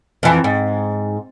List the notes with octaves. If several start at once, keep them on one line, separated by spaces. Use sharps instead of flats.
F2 E3
G#2